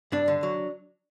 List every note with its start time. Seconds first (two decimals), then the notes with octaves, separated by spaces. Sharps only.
0.12 G2 D4
0.28 D3
0.43 F#3